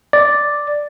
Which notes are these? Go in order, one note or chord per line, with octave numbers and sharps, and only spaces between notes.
D5